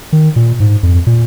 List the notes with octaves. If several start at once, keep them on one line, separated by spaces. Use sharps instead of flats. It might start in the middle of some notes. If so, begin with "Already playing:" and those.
D#3
A#2
G#2
F2
A#2